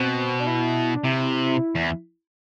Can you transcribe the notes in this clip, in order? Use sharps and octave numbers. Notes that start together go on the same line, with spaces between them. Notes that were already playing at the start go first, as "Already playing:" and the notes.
Already playing: B2 C4
D4
E4
D4
C3 E4
E2